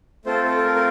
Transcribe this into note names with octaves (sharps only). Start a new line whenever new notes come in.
A3 C4 F4 A4 C5
A4
A4
A#4
A#4